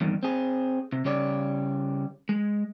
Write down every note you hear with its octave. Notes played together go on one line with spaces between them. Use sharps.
E2 G2 D#3
C4 G#4
C3
C#3 G3 C#5 D5
G#3